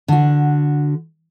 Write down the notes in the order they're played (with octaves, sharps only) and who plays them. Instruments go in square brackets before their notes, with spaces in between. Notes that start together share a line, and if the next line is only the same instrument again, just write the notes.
[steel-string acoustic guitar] D3 F#4